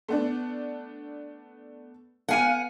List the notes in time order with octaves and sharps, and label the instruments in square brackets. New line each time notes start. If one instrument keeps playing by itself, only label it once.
[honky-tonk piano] A3 B3 D4
[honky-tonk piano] B3 F5 D#7 [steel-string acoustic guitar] F#5 G#5